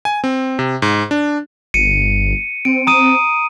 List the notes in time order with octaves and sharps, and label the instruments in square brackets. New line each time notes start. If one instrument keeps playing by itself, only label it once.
[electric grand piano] G#5
C4
C3
G#2
D4
[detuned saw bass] G1 [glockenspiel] C#7 D#7
[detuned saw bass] C4 [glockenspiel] D7
[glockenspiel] A#5 D#6 D#7